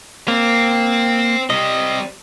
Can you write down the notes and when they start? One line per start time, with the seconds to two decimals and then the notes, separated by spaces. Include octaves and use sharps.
0.28 A#3 C4
1.50 C3 G3 D#5